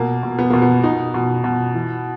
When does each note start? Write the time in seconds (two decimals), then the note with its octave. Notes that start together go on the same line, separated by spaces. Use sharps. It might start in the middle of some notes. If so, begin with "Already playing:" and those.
Already playing: B2 A#3
0.23 B2
0.39 B3
0.50 B2 A#3
0.62 B3
0.83 B2 D#4
1.14 B2
1.44 B2
1.74 E3